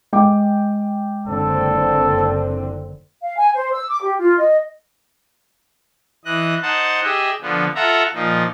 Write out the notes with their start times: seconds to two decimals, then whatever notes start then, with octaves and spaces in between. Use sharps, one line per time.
0.13 G#3 G5 D6
1.27 F#1 D3 C4 A4
3.22 F5
3.36 G#5
3.55 C5
3.72 E6
3.90 D6
4.01 G4
4.19 F4
4.38 D#5
6.25 E3 D#5 F#6
6.62 D#4 C5 F#5 A5
7.04 G4 G#4 D#5 E5
7.42 D3 F3 B3
7.75 F4 A4 E5 F#5 A#5
8.14 A#2 F3 D#4